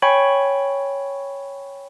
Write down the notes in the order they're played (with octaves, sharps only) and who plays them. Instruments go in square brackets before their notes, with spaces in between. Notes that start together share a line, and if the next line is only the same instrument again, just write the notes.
[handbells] C#5 G5 G#5 B5 C#6